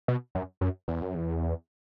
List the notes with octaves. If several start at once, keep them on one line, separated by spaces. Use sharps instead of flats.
B2
F#2
F#2
E2
F#2
E2